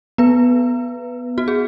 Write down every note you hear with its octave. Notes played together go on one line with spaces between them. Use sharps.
B3 B4
F#4
G#4